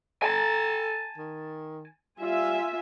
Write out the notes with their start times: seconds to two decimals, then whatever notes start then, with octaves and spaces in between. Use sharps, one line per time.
0.22 A4 G#5 A5
1.17 D#3
2.20 G3 F4 E5 G#5